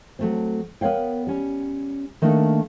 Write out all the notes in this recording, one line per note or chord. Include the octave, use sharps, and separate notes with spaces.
F#3 A3 C4
B3 A#4 C#5 F5 G5
G3 C#4
D#3 A3 A#3 D4 D#4